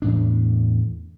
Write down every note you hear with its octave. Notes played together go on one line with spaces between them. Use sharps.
E2 A2 D4